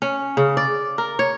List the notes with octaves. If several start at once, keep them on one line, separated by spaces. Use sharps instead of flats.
C#4
C#3
D5
A#4
C#5